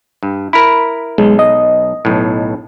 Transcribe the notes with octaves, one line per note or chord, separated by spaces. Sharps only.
G2
E4 A#4 B5
B1 G#3
D#5
B1 A2